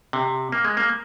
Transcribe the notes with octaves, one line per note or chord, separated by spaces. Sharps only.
C3
A#3
G#3
A#3